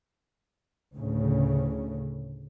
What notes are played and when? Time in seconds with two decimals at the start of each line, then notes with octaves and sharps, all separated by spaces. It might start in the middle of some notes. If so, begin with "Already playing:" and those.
0.95 D2 A2 C#3